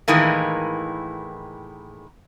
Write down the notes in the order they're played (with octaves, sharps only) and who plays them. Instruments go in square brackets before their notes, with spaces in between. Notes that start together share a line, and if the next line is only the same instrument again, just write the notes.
[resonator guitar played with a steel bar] A2 D#3 E3 G#3 A#3